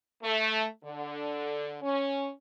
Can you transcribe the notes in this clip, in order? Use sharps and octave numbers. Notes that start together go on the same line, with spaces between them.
A3
D3
C#4